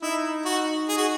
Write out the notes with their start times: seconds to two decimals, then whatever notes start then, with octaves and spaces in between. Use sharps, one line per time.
0.02 D#4 E4
0.45 F#4
0.88 G#4
0.97 F#4